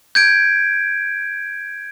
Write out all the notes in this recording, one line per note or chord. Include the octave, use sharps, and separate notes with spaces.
G6 G#6 D7